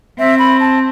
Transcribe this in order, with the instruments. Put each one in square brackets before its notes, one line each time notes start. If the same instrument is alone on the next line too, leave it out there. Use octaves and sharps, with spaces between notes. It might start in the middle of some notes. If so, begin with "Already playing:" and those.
[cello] C4 [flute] E5
[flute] B5
A5